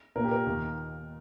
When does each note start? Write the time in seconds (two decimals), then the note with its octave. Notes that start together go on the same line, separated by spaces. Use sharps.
0.16 A#2 A#3 A#4
0.24 G4
0.31 A#4
0.46 D#2 D#3 A#3